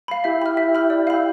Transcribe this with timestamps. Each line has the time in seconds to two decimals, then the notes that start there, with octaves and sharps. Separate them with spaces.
0.08 F5 B5
0.24 E4 G4 E5
0.42 B5 F6
0.57 E5
0.75 B5 F6
0.90 D5
1.07 F5 B5